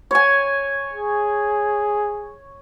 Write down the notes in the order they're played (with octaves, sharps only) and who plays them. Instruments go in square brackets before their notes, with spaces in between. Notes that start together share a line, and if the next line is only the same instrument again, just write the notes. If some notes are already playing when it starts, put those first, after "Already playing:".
[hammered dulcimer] C#5 G#5
[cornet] G#4